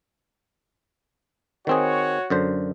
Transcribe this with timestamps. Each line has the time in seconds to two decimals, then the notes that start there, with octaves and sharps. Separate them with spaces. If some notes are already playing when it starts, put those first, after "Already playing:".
1.67 D#3 C4 F#4 G#4 C#5
2.30 F#2 D3 C5